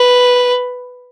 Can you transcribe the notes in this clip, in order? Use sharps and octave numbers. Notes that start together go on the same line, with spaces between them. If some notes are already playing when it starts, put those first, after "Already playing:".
Already playing: B4